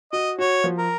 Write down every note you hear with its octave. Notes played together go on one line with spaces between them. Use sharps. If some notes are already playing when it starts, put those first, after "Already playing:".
F#4 D#5
F#4 C#5
F3
A#4